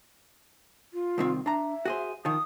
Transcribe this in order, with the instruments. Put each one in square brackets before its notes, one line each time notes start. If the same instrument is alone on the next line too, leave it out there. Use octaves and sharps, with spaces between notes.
[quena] F4
[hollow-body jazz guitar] C2 D#3 C4
[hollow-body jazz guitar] D4 A#5 [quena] E5
[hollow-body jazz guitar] F#4 G#4 C5
[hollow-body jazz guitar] D#3 F3 [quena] D#6